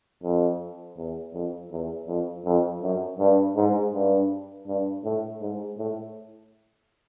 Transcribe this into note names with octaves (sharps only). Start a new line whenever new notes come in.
F2
E2
F2
E2
F2
F2
F#2
G2
G#2
G2
G2
A2
G#2
A2